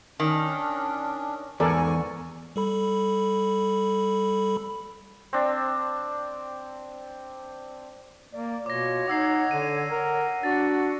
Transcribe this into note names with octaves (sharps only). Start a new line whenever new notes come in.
D#3 C#4 D4
E2 G#2 A4 A#4 D5 G#5 C#6
G3 A4 B5
C4 D4
A#3 D5
B2 F4 C#5 D6 A#6
D#4 F#5 D6 E6 C7
D3 D#7
A#4 F#5
D4 F#4 A6